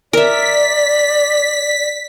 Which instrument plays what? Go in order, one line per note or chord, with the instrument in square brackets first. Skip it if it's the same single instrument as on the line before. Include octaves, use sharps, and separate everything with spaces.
[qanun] A#4 E5 [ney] D5 [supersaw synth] B6